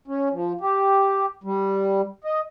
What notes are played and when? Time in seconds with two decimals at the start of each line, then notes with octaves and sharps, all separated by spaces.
0.08 C#4
0.32 F3
0.61 G4
1.43 G3
2.24 D#5